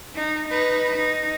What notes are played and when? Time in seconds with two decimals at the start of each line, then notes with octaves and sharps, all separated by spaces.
0.15 D#4
0.48 D#4 B4
0.96 D#4